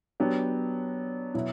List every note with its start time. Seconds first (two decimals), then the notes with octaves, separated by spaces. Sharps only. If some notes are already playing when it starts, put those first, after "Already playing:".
0.20 F#3 B3 D4 G4
1.34 B2 F#3 B3 E4